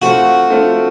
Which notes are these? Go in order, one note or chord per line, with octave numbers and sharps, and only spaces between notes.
A3 C4 F4 F#4
A3 C4 F4